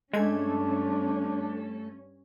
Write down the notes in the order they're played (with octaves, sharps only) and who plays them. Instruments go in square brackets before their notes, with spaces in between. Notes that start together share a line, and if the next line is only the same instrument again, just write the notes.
[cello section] G2 C#4 [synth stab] G#3 G#6 [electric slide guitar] A3 A4 [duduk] D4